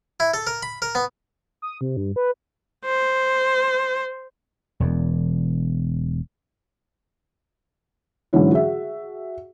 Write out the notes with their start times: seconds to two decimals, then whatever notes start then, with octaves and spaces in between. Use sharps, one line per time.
0.20 E4
0.34 A4
0.47 A#4
0.63 B5
0.82 A#4
0.95 B3
1.62 D#6
1.81 C3
1.97 G2
2.16 B4
2.85 C5
4.80 E1 E2
8.33 G#2 D3 E3 F#3 C#4 E4
8.51 F#4 G#4 E5